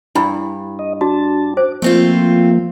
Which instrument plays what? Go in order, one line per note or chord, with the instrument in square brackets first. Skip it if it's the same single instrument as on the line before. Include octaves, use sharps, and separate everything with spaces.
[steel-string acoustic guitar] G2 [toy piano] D4 E4 B5
[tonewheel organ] D#5
[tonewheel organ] D4 A5 [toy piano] F#4
[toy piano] C5 [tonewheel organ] D6
[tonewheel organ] F3 A#3 [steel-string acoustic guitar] A3 C4 F4